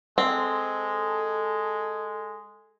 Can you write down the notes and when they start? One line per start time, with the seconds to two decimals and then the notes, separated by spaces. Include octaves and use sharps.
0.18 G#3 C4 A4